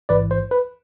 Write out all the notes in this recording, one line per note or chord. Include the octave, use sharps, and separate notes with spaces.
A1 G#2 E3 B4 D5
C5
B4